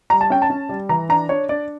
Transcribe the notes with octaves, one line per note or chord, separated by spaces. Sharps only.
G3 A#5
A5
C#4 G5
A5
C#4
G3
E3 A#5
D4 A#5
D4 C#5
D4 D5